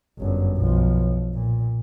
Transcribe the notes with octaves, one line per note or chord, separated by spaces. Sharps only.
G1 F#2
B1 F3
A#2